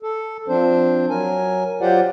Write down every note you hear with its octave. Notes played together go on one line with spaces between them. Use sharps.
A4
F3 C4 D4 C5
F#3 A#4 G#5
F#3 F4 G4 C5 D5 F#5